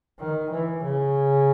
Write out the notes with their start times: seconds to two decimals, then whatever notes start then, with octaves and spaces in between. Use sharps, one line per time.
0.19 D#3
0.51 E3
0.84 C#3